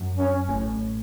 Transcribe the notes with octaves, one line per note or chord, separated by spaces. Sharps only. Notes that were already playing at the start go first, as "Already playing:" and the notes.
Already playing: F#2
C#4
A1 A2